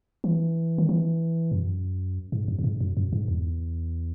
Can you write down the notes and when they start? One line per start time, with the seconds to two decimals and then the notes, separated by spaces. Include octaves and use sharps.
0.24 E3
0.78 D#3
0.89 E3
1.52 F#2
2.32 G#2
2.48 F#2
2.59 F#2
2.64 G#2
2.80 F#2
2.97 F#2
3.13 G#2
3.28 E2